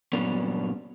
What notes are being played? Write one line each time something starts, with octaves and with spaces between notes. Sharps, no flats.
G2 A#2 F#3 B3 C#4 D4